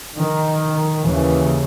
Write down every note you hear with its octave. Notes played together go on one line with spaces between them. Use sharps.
D#3
D#2 C#3 E3